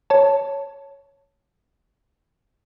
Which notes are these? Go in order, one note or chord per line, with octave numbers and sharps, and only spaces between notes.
C#5 A5